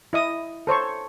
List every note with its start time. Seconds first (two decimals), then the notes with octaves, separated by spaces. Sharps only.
0.13 E4 D#5 D#6
0.67 A4 C5 C#5 C#6